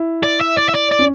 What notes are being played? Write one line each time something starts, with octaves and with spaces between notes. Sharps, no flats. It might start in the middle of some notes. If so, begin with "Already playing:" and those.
Already playing: E4
D5
E5
D5
E5
D5
D5
C#4